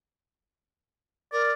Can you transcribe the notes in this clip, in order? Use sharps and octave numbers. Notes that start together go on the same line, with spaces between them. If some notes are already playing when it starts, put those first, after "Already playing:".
A#4 D5